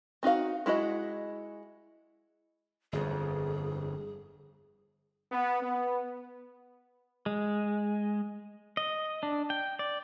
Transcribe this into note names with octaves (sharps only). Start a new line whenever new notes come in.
C4 D#4 F#4 F5
G#3 E4 F#4 D#5
G1 F2 G#4
B3
B3
G#3
D#5
D4
G5
D5